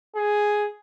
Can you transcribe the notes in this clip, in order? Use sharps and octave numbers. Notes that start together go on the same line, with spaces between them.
G#4